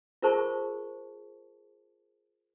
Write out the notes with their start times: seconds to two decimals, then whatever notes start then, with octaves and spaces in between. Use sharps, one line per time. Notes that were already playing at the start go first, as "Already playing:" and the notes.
0.22 F4 G#4 A#4 C5 A5 C#6